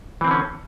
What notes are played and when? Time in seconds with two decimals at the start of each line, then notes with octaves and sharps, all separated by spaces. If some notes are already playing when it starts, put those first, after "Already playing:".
0.21 E3
0.24 C4
0.28 D3
0.31 C#4